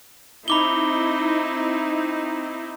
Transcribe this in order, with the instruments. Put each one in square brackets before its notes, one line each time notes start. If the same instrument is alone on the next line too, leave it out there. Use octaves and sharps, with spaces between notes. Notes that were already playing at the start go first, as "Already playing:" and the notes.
[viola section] C4 D#4 E4 [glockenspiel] B5 D6 G7